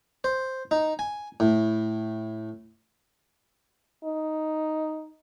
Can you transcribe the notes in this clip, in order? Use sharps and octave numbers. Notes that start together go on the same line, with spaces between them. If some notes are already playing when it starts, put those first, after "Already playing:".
C5
D#4
G#5
A2
D#4